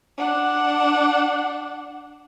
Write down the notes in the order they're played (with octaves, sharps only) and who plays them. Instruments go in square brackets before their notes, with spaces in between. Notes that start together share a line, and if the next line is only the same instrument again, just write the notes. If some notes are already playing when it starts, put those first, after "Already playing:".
[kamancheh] D4 F#5